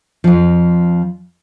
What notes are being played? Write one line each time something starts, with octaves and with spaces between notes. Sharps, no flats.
F2 F3